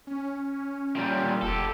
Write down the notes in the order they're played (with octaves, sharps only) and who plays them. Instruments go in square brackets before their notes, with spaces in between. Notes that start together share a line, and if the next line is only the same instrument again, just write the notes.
[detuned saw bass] C#4
[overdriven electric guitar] A#2 G3
[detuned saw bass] E1 [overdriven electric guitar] G4 A4